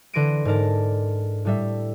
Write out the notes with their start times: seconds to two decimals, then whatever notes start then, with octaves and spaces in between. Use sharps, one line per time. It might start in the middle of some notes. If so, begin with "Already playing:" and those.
0.13 D3 E3 C6 A#6 D7 D#7
0.45 G#2 D3 A#4 A5
1.45 A2 G3 E5